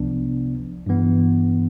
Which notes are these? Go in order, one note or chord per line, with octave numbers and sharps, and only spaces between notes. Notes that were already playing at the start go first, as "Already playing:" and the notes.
Already playing: C2 C3 F3 B3 D4
G2 E3 B3